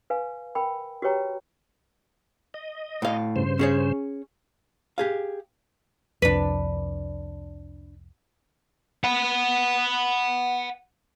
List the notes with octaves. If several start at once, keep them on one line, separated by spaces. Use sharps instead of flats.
B4 F5 G#5
A#4 G5 B5
F#4 G4 B4 C#5 G5 A#5
D#5
A2 F5
G2 C#3 C5
C#4 G#4 C#5
G4 G#4 F5
C2 F2 D4 B4
F#5 B5